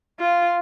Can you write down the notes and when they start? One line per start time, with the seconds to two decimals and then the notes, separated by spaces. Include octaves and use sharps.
0.19 F4